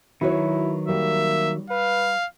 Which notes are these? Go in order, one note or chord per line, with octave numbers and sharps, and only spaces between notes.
D#3 F#3 E4 F#4 B4 C#5
G3 A#3 E5
B4 F5